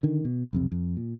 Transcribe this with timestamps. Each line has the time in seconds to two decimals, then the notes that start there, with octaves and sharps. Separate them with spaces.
0.03 D3 D#3
0.25 B2
0.53 B1 F2 C3
0.72 F2
0.97 A#2